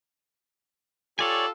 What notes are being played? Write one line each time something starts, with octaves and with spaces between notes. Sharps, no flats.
F4 G4 A4 C#5 D5 G#5